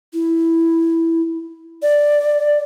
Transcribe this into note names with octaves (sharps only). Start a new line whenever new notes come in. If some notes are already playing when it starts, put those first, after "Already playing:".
E4
D5